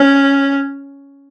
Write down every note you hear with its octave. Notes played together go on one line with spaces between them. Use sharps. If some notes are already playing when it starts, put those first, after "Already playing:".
Already playing: C#4